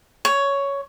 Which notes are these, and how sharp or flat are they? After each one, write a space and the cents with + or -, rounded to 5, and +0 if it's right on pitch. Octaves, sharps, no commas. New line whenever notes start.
C#5 +10